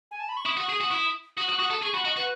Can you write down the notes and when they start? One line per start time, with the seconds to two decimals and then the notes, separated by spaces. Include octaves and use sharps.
0.11 G#5
0.20 A5
0.29 B5
0.37 C#6
0.45 E4 D#6
0.57 F#4
0.69 G#4
0.80 F#4
0.91 E4
1.37 F#4 D#6
1.49 F#4
1.53 C#6
1.59 F#4 D#6
1.71 A4
1.82 G#4 C#6
1.94 F#4 B5
2.05 F#4 D#5
2.17 F#4 B4